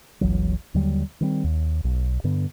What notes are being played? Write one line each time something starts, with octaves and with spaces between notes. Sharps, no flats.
G1 C#2 E3 F#3
D#2 D3 F#3 G3
D#3 G3 C4
D#2
B1
G2 D3 B3